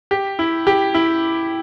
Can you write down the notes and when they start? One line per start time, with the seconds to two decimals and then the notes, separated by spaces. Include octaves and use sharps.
0.11 G4
0.39 E4
0.67 G4
0.94 E4